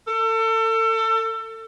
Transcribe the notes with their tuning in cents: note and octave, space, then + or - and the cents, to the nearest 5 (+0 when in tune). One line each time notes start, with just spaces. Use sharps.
A4 +30